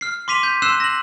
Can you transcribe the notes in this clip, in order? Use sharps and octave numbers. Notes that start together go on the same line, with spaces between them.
F6 C7
C6 D6 B6 D#7 F7
G6 B6
C6 E6 F#6 C7 E7
A#6 F#7